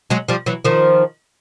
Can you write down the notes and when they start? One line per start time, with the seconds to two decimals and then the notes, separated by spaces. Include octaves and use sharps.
0.10 F#3 G#3
0.28 F3 G3
0.46 E3 F#3
0.65 D#3 F3